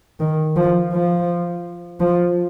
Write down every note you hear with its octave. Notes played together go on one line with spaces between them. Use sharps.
D#3
F3
F3
F3